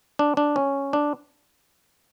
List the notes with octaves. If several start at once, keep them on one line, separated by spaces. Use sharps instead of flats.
D4
D4
C#4
D4